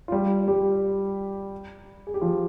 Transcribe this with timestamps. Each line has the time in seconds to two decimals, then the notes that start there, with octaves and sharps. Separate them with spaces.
0.08 F4
0.12 G3 G4
0.48 G3 G4
2.07 G#4
2.14 G4
2.21 F3 F4